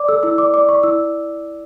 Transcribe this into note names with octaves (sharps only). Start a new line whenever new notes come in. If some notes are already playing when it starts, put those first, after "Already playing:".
Already playing: D5 D6
A4 E6
E4 E6
D5 D6
D5 D6
D5 C#6
E4 E6